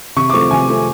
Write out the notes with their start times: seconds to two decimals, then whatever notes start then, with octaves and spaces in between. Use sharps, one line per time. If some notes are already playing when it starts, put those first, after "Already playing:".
0.16 C3 C#6
0.30 D6
0.33 F3 A3 C4 C#6
0.51 C3 G#5
0.68 F3 A3 C4